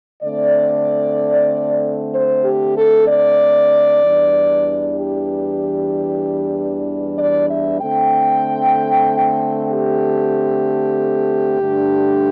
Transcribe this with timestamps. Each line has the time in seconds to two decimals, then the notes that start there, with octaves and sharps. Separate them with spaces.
0.22 D3 A3 C4 D5
2.13 C5
2.44 G4
2.76 A4
3.08 D5
4.03 E2 E3 G3 D4
4.97 G4
7.18 D5
7.50 E5
7.81 D3 A3 C4 G5
9.72 G4
11.60 G2 D3 A3 D4